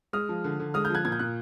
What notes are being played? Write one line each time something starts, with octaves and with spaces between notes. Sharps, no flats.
G#3 D#6 F6
F3
D3
D3
G#3 D#6 F6
F6 G6
F3 F#6 G#6
A#2 G#6
G6
A#2 F#6